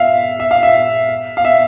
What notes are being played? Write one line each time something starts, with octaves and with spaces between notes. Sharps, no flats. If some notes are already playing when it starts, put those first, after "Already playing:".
Already playing: E5 F5
E5
F5
E5
F5
E5